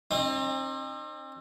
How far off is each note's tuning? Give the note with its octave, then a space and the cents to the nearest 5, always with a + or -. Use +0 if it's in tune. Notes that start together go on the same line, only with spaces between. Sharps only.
C4 +35 D#4 -35